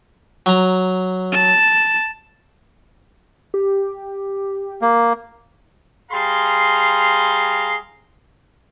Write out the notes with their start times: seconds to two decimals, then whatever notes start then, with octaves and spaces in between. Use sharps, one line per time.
0.46 F#3 A#5
1.32 A5
3.54 G4
4.82 A#3
6.12 G3 G#4 F5 A#5 C6